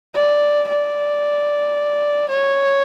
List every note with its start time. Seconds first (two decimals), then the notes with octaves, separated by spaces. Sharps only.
0.15 D5
0.68 D5
2.29 C#5